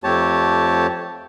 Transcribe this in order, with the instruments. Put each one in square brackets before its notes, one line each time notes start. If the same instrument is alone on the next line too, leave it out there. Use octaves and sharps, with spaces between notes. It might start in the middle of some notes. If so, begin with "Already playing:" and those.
[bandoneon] F2 A3 G4 C#5 A5